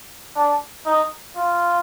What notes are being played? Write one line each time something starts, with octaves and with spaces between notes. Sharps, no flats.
D4
D#4
F4